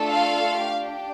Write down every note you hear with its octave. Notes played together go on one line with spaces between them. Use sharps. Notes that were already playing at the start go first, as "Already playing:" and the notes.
Already playing: A3 D4 F4 A4
F5
D4 G4